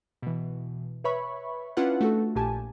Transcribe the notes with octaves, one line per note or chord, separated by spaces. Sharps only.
B2 E3
B4 C#5 E5 B5 C#6
C#4 D4 E4 F4 B4 F#5
A3 F#4 A4
A#1 A#2 G4 G#5 A5